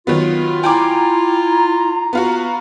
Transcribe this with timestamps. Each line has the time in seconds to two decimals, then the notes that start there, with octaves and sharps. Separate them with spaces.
0.07 D#3 F#3 B3 F4
0.64 E4 G5 G#5 A#5 D6
2.13 B3 F4 F#4